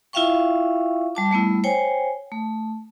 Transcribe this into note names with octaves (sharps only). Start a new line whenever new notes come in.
E4 F4 E5 F5 G5 C#6
G3 A5 D6
G3 A3 B3 E4
C5 C#5 G5 G#5
A3